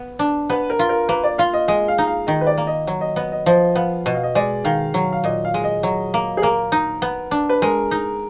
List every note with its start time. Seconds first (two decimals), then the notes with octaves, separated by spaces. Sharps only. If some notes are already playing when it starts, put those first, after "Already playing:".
Already playing: B3
0.19 D4
0.50 B3 B4
0.70 A#4
0.79 F4
0.89 A#4
1.08 A#3 B4
1.24 D5
1.38 F4 F5
1.54 D#5
1.68 G#3 D#5
1.88 F5
1.98 D#4
2.07 F5
2.27 D#3 D#5
2.41 B4
2.47 D5
2.58 A#3
2.67 D#5
2.87 F#3
3.01 D#5
3.16 B3 D#5
3.32 D#5
3.46 F3 D#5
3.75 B3 F5
4.06 B2 D#5
4.15 F5
4.23 D#5
4.35 G#3 D5
4.64 D#3 F5
4.94 F#3
5.12 F5
5.24 A#2 D#5
5.45 F5
5.54 G#3
5.64 D#5
5.83 F#3
6.14 A#3
6.37 G#4
6.42 A#3 A#4
6.72 D#4
7.02 B3
7.31 D4
7.49 B4
7.62 G#3 A#4
7.91 D#4